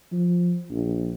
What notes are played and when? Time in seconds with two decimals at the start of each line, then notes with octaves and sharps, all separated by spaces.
0.12 F3
0.70 A#1